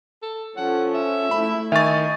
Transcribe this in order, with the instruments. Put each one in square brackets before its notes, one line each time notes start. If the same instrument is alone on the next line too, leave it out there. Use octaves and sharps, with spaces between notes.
[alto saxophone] A4
[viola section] F3 C#4 A4 [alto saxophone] F#5
[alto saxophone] E5
[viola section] A3 E4 [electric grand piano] B5
[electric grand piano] D#3 A6 [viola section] D#5 [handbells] E5 C#6 [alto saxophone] G#5